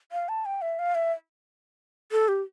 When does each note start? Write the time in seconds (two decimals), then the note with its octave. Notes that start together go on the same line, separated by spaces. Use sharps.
0.12 F5
0.29 A5
0.45 G5
0.62 E5
0.79 F5
0.95 E5
2.12 A4
2.28 G4